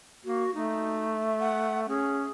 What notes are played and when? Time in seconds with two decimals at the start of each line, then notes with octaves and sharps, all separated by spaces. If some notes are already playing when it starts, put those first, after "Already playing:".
0.25 A#3 F#4
0.55 A3 D#4
1.26 E5
1.40 F#5
1.89 C#4 G#4